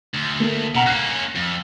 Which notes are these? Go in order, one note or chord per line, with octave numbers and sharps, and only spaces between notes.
D2
A3 A#3
B2 F#5 A#5 F6
A#3 C#4 F#6 C7
F2